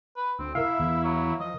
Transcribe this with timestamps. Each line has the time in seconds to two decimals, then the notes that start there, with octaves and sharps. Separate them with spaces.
0.16 B4
0.39 D2 C4
0.55 E4 A#4 E5 F5
0.80 E2
1.04 F#3
1.40 F3 D#5